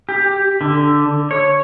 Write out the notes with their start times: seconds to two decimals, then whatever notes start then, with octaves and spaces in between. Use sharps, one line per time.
0.09 G4
0.61 D3
1.31 C#5